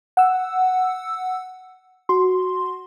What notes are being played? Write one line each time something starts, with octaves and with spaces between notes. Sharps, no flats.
F#5 E6
F#4 C6